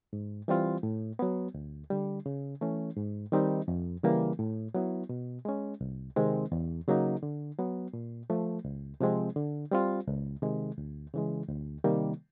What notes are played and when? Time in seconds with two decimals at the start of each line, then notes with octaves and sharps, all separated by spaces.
0.13 G#2
0.48 E3 G3 C4 F4
0.83 A2
1.19 F#3 B3
1.54 D2
1.90 D3 G3
2.26 C#3
2.61 E3 A3 C#4
2.97 G#2
3.32 D#3 G3 C4 D#4
3.68 F2
4.04 C#3 E3 G3 A#3
4.39 A2
4.74 F#3 B3 E4
5.09 B2
5.45 G#3 C#4
5.81 C2
6.16 C3 D#3 G#3 C4
6.52 E2
6.88 C#3 F#3 A#3 D#4
7.23 D3
7.58 F#3 B3
7.93 A#2
8.30 F3 A3
8.65 C#2
9.00 C3 F3 G#3 C4
9.36 D3
9.71 G3 C4 F4
10.07 C#2
10.42 C3 D#3 G#3
10.78 D2
11.14 C#3 E3 G#3
11.49 D2
11.84 C3 D#3 G3 A#3